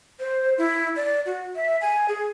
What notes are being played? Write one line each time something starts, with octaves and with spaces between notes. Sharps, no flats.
C5
E4
D5
F#4
E5
G#5
G#4